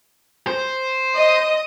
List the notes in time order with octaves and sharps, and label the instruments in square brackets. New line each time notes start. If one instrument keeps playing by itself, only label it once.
[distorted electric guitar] C5
[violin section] D#5 D#6